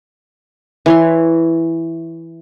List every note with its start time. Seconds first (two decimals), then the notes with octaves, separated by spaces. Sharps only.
0.86 E3 C#5 C6